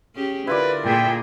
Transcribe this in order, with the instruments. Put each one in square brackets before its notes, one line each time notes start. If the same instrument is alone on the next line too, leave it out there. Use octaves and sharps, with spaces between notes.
[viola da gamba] C#4 G4 G#4
[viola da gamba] D3 A#4 [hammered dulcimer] E4 F4 D5 [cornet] B4
[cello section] A#2 G#4 E5 [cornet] G5